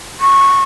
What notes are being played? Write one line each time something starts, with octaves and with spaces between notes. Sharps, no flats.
C#6